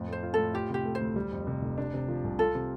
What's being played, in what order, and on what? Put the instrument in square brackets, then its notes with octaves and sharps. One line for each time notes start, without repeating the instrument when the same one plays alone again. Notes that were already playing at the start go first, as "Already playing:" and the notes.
Already playing: [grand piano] F2 A2
[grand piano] A3 [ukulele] C5
[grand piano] F4
[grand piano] A2 [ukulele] A4
[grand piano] F4 [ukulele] G4
[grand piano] C3 [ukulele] G4
[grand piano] A3
[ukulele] C5
[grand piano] D2
G3
F2
C3
F1
D4
C3
F3
C2
[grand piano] F4 [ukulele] A4
[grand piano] C3